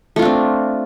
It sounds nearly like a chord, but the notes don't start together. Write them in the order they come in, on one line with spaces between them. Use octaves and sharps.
A3 F4 D4 C4